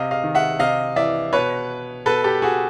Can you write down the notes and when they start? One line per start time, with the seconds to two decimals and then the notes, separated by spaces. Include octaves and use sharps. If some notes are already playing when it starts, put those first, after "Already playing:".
Already playing: C3 D#5 F5
0.11 D#5 F5
0.24 D#3
0.35 E5 F#5
0.59 C3 D#5 F5
0.96 E3 D5 E5
1.33 B2 B4 C#5
2.06 B2 A4 B4
2.24 G4 A4
2.42 F#4 G#4